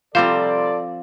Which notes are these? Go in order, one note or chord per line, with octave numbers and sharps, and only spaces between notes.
C3 F3 G3 C4 A4 C5 D5 F5